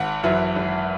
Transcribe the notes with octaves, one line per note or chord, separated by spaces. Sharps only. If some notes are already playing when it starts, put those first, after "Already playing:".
Already playing: G#1 F#5
F#2 E3 E5
G#1